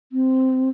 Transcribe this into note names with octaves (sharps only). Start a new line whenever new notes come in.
C4